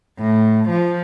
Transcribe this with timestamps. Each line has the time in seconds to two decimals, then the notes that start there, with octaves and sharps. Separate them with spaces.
0.19 A2
0.69 F3